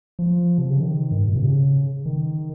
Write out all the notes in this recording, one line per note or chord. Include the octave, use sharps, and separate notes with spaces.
F3
C3
C#3
D#3
G2
G#2
A#2
C3
C#3
D#3